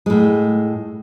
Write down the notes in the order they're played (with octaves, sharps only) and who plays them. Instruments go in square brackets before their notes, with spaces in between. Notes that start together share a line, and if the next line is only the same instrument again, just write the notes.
[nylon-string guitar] A2 G#3